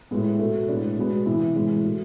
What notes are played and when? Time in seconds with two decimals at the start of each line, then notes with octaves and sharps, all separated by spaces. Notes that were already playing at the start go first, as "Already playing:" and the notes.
0.11 A2 G#3 B3
0.39 B2 A3
0.68 A2 G#3 B3 D4
0.97 B2 G#3 B3
1.26 C3 E3 B3 E4
1.55 A2 E3 G#3 B3
1.84 B2 A3